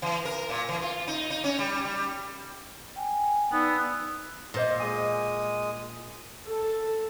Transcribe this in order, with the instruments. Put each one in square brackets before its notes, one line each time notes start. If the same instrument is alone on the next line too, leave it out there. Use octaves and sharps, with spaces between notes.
[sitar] E3
A#4
A#2
E3
F4
D#4
D#4
C#4
G3
G3
[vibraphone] G5 G#5
[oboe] B3 [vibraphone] D#4 D5 E6
[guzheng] A#2 [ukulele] F4 C5 D#5
[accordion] G#3 D#6 [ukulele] G#4 G#5
[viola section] A4